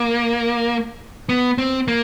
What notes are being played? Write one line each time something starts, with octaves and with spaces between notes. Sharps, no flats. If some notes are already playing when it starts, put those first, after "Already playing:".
Already playing: A#3
B3
C4
A#3